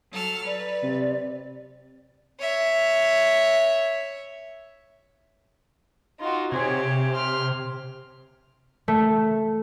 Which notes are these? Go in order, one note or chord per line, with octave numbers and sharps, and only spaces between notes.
F#3 A4 F6
B4 D5
C3
C#5 E5
D#4 F4 F#4
C3 C4 G4 G#4 C#5
C6 F6
A3